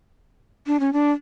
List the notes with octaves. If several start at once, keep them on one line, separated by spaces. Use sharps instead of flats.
D4
C#4
D4